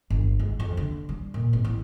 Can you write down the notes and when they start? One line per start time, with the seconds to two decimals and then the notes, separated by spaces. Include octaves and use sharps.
0.10 G1
0.40 G#2
0.60 F2
0.77 D3
1.09 G3
1.34 A#2
1.53 G#1
1.64 A1